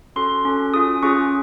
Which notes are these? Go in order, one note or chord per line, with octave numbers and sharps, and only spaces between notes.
C#4 F#4 A4 C6
C#4 F#4 A4
C#4 F4 G#4 D#6
C#4 F4 G#4 C#6